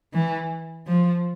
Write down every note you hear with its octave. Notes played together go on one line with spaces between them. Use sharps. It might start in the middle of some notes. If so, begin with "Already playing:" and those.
E3
F3